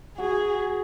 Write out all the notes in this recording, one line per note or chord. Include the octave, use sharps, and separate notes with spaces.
F#4 G#4